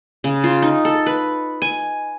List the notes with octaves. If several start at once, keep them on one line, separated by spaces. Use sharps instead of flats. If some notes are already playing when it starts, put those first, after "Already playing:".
C#3
F4
D#4
A4
B4
G#5